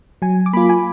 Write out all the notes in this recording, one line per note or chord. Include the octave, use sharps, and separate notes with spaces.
F#3 G#5
D6
A#3 F4 B5
G#5